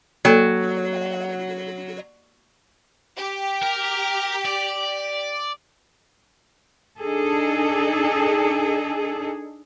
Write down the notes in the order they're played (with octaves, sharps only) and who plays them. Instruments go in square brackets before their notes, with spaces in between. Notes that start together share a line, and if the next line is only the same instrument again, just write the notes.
[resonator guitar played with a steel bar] F#3 [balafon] A#3 A4
[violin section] G4
[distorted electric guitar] A#4
D5
[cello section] D4 D#4 G#4 A4